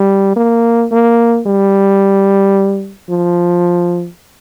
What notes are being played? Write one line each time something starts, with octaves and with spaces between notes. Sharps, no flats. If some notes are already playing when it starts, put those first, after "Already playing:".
Already playing: G3
A#3
A#3
G3
F3